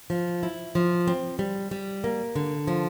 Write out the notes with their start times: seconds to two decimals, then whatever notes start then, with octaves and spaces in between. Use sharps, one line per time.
0.10 F3
0.43 E4
0.75 F3
1.08 C4
1.39 G3
1.71 G3
2.04 A#3
2.35 D3
2.67 F3